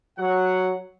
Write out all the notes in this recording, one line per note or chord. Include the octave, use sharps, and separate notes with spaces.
F#3 F#5